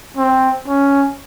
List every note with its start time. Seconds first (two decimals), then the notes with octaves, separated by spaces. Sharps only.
0.17 C4
0.67 C#4